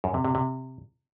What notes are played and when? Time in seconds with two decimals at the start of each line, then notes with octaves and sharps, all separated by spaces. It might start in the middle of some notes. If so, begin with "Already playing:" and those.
0.04 F#2
0.14 C3
0.25 C3
0.35 C3